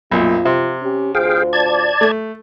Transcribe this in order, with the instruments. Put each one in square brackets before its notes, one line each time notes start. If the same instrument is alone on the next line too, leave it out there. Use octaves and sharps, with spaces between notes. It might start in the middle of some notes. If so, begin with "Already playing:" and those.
[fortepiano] B1 F#2 A#2 [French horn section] F3 C4 F4
[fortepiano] C3
[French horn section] C#4 G4
[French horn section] D2 F4 C5 [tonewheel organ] G#4 F5 G5
[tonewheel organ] D5 A5 G#6
[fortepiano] A3